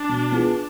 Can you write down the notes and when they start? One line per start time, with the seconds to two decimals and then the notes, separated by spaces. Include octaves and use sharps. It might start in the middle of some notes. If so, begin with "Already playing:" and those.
Already playing: D4
0.09 B2
0.32 B3 F4 G#4